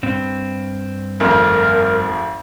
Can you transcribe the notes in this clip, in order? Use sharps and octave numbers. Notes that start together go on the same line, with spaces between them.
G2 C4
G#1 F2 A3 A#4